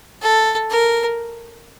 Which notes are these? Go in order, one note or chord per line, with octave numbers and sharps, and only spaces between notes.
A4
A#4